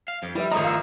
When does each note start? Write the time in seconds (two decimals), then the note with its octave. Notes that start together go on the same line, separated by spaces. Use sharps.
0.08 F5
0.23 F2
0.35 G3 E4 B4 E5
0.52 G#1 F3 A3 D#5 A#5
0.64 F5 E6